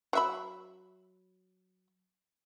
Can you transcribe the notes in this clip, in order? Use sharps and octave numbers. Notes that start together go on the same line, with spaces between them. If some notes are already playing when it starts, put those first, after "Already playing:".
F#3 E5 B5